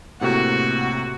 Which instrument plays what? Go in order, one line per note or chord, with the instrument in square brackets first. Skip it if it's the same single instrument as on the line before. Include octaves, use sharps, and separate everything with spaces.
[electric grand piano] A2 C3 A#3 [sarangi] F#4